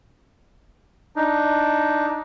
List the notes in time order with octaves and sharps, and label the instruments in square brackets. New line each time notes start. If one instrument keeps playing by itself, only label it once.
[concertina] D4 D#4